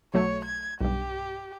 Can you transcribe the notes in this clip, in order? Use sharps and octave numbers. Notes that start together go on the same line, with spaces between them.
B1 F#3 A3 C#5
G#6
B1 G2 G4